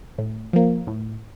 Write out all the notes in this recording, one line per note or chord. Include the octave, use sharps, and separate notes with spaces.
A2
F3 A#3
A2